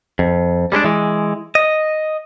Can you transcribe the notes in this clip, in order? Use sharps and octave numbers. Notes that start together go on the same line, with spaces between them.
F2
G3 G#3 C#4 D4
E3 G#3
D#5